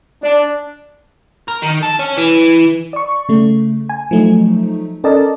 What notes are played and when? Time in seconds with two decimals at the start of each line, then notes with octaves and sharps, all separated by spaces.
0.23 D4
1.48 A#4
1.62 D#3
1.83 A4
1.99 C#4
2.17 E3
2.93 D5 C#6
3.29 C#3 A3
3.89 G#5
4.11 F3 F#3 A3 D#4
5.04 C#4 A4 A#4 D5 D#5 A5